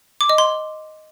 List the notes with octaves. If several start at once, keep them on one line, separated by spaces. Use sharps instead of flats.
D6
D#5
C6